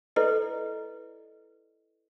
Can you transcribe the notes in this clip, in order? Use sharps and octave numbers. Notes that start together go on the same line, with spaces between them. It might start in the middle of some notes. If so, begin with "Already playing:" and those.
E4 A4 B4 D5 D#5